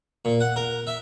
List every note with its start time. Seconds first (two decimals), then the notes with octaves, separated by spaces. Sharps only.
0.25 A#2
0.41 F#5
0.56 A#4
0.87 E5